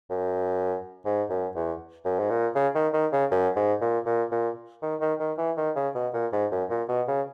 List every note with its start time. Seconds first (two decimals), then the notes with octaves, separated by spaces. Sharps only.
0.10 F#2
1.05 G#2
1.30 F#2
1.55 E2
2.05 F#2
2.20 G#2
2.30 A#2
2.55 C#3
2.75 D#3
2.93 D#3
3.12 C#3
3.31 F#2
3.56 G#2
3.81 A#2
4.06 A#2
4.32 A#2
4.82 D#3
5.01 D#3
5.20 D#3
5.38 E3
5.57 D#3
5.76 C#3
5.95 B2
6.14 A#2
6.33 G#2
6.52 F#2
6.70 A#2
6.89 B2
7.08 C#3